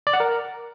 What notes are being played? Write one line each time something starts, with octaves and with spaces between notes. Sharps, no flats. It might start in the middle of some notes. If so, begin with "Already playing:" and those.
D5
F#5
A#4